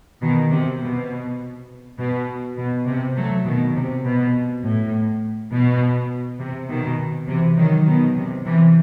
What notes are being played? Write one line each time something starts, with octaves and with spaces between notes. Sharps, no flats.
B2 D#3
C3
B2
B2
B2
C3
F#3 A3
B2 D#3
C3
B2
A2
B2
C3
B2 D#3
C3 E3
D#3 F#3
B2 D#3
C3
C3 E3